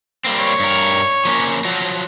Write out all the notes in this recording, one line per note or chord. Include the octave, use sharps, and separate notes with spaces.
G3 A#3 C4
C#5
G2 A#4
F3 A#3 C#4
F3 F#3